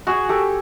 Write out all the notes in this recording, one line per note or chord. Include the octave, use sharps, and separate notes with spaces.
F#4 G#4
G4 A4